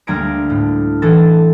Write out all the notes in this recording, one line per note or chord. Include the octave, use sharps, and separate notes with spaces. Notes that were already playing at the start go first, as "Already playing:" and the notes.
D2 G3 A#3 A#5 G#6 D7
A2
E3 G#4 A4 A6